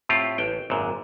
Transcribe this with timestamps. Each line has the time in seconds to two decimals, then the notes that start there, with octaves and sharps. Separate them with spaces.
0.09 A2 C4 F4 G4
0.38 A1 G5
0.70 G#1 F#2 A#2